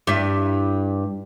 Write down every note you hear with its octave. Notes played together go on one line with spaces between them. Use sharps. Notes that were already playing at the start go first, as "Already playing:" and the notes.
G2 E4